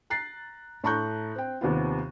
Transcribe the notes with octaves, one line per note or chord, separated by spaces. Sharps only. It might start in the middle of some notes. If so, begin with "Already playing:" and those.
A#5 F#6 A6 C7
A2 A5 A#5 C#6 F#6 G6
C4 G5
D#2 C3 B3 F4